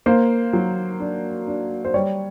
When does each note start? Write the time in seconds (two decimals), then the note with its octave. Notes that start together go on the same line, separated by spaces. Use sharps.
0.06 A#3 C5
0.53 F#3
1.00 D4
1.47 D4
1.85 C5
1.94 G3 C#5